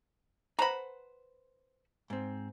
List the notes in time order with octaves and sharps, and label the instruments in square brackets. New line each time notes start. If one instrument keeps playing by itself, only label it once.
[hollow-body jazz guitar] B4 C5 F#5 [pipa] A#5 B5
[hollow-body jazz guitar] G#2 C4